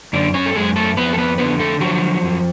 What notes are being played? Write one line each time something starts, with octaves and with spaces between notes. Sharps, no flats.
F#2 D3 D4
C#4 C#5
A4
F#2 G#3 G#4
A3 A4
F2 B3 B4
A4
B3 B4
D3 B3 B4
A3 A4
F3 F#3 F#4
F2